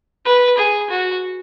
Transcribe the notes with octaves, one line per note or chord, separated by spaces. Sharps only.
B4
G#4
F#4